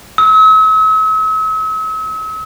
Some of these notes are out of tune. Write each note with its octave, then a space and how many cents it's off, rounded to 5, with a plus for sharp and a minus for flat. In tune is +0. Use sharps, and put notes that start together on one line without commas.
E6 -45